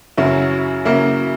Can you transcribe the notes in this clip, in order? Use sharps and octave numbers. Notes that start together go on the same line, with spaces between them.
F#2 C#3 F#3 C#4 E4
C#3 F#3 A#3 E4